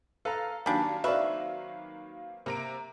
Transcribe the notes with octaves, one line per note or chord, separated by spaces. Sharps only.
A4 B4 F5 A#5
D#3 F#3 G3 A#3 D4 G#5
C4 F#4 B4 D5 E5 F5
C3 A#3 A#5 D7